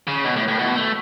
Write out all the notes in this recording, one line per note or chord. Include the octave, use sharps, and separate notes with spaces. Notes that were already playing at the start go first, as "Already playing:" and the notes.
C#3
B2
A2
A2
B2
A3